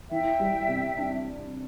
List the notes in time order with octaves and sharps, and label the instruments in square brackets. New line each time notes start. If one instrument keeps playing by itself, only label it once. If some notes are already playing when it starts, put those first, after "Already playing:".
[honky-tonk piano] E3 [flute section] E5 G5
[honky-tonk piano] G3
C3
D4